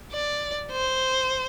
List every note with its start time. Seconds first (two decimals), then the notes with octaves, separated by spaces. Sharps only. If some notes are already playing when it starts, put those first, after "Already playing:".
0.12 D5
0.72 C5